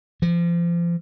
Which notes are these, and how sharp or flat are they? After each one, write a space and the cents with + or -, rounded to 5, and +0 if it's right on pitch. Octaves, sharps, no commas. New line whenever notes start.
F3 -30